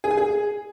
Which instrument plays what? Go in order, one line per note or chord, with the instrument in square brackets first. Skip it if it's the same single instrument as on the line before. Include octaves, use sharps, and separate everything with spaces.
[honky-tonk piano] G#4
G#5
G#4